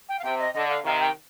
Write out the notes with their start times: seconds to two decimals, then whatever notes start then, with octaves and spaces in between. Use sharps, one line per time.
0.08 G5
0.19 F5
0.24 C3 G5
0.39 D#5
0.54 D3 D#5
0.69 F5
0.84 C3 D#3 F5
1.00 G5